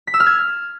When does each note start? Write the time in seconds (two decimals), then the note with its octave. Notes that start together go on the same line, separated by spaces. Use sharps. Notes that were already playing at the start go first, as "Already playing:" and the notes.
0.07 B6
0.14 E6
0.20 F6
0.26 G#6